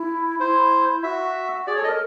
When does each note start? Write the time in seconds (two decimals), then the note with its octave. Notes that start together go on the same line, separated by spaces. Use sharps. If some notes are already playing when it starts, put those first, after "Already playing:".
Already playing: E4
0.40 E4 C5
1.03 F#4 E5
1.67 G#4 D5
1.76 C#5
1.79 A4 D#5
1.89 A#4